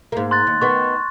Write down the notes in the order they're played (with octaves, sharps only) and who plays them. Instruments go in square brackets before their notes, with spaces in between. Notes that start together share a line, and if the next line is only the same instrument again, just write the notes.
[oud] G#2 A#3
[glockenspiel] C6 F#6 A6
[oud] D#2
[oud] D#3 B3 [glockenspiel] C6 C#6